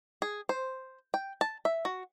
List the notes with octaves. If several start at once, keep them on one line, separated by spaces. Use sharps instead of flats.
G#4
C5
G5
A5
E5
F#4